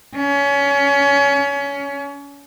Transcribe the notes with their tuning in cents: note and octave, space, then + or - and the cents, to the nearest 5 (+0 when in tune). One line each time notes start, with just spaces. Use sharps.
C#4 +25